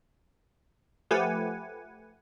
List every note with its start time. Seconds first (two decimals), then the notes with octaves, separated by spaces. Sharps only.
1.11 F3 A3 G4 B4 F#5 G#5